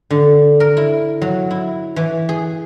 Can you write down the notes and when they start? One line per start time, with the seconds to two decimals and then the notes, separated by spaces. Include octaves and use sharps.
0.10 D3
0.60 A#4
0.77 E4
1.21 F#3
1.51 E4
1.96 E3
2.29 G#4